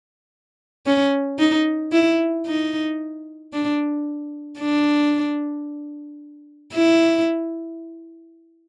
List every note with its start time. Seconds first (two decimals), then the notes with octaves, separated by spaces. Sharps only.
0.86 C#4
1.39 D#4
1.92 E4
2.47 D#4
3.53 D4
4.60 D4
6.74 E4